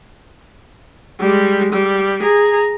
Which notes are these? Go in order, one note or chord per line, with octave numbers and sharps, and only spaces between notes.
G3 G#3
G3
G#4 A#5